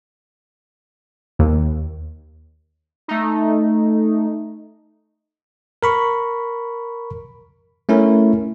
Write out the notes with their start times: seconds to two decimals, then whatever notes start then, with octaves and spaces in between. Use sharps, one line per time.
1.39 D#2
3.08 A3 D#4
5.83 A#4 B5 C#6
7.89 A3 C#4 E4 A#4